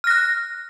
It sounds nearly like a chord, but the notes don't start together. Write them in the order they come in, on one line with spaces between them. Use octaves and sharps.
F6 A#6 F#6